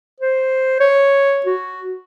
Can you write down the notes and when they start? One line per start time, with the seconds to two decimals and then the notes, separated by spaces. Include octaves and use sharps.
0.20 C5
0.80 C#5
1.46 F#4